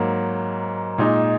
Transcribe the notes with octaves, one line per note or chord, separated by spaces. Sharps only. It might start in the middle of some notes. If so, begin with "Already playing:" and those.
Already playing: G#2 F#3 A#3
A#2 G#3 D#4